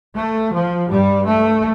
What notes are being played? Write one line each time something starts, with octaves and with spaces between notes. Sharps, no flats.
A3
F3
G2 G3
A3